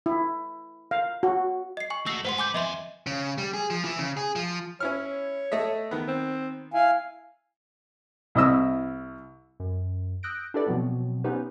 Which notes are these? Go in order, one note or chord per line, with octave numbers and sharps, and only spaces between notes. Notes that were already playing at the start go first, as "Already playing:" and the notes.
E4
F5
F#4
D#5 C7
G#5 C#6
A3 F#4 E6 A#6 C7
G#2 B4 C5 F#5 C6
G#5 D6 G6
F2 D#5 E5 G#5 C6
C#3
G3
G#4
F3
E3
C#3
G#4
F3
C#4 E4 C#5 F6
A3 D#5 E5
D#3 B3
C4
E4 F5 G#5
C2 E4 D#5 E5 E6
F#2
D#6 E6 F#6 G6 A#6 D7
D4 E4 G4 A4 B4 D5
B2 F3 F#3 B3 C4
B3 C#4 D#4 G4 B4 C5